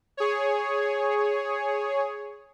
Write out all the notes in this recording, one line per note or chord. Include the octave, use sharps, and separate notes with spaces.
G#4 C#5